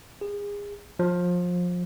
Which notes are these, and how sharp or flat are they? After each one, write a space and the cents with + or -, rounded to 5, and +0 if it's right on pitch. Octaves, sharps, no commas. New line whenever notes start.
G#4 -30
F3 +25